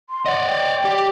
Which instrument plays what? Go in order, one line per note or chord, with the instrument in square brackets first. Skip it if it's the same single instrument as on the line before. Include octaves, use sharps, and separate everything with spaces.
[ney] C6
[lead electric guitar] D5 D#5 [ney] F#5
[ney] G5
[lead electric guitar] G4